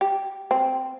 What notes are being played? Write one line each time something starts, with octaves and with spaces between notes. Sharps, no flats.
G4
C4